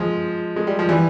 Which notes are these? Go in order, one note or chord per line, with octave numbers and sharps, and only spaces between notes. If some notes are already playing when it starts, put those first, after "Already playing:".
Already playing: F3 G#3
G#3
G3
F3
E3 G3